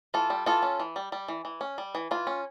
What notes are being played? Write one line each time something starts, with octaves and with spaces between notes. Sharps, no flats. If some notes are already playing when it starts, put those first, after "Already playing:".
E3 F4 A4
G3
E3 F4 A4
C#4
E3
G3
G3
E3
E3
C#4
G3
E3
E3 F4
C#4